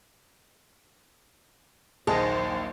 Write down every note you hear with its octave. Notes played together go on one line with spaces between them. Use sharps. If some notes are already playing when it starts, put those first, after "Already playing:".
A#1 D#2 F#3 D#4 G#4 C5 D#5 A5